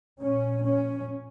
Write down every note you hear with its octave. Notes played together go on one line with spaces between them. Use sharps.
A#1 A#2 C#4
C#4